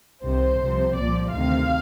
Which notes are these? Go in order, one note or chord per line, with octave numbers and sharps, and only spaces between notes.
C2 C3 D#3 C5
C2 C3 F3
C2 A#2 F3 D5
D2 C3 D#3 F5